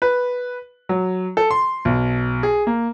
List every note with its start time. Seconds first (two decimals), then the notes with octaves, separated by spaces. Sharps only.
0.02 B4
0.89 F#3
1.37 A4
1.51 C6
1.85 B1
2.43 G#4
2.67 A#3